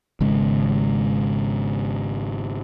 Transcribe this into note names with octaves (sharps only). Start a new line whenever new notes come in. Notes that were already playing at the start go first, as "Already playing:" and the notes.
G#1 C#3 G#3